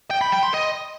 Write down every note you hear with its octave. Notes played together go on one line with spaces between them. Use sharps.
G5
B5
G5
C6
D#5